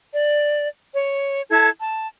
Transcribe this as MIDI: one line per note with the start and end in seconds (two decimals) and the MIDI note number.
0.12 0.68 74
0.94 1.42 73
1.50 1.70 64
1.50 1.70 69
1.50 1.70 81
1.50 1.70 92
1.80 2.06 81